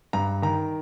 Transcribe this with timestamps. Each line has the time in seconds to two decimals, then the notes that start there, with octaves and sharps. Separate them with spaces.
0.13 G2 A#5
0.42 D#3 A#5